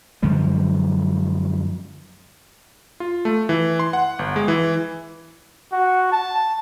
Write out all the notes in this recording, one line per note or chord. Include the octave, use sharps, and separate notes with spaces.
F#2 D3 F3 G#3
F4
A3
E3
C6
F#5
G1
G#3
E3
F#4
A5